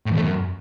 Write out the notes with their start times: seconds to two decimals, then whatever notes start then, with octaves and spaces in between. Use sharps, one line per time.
0.06 A2
0.11 E2
0.17 A3
0.22 F#2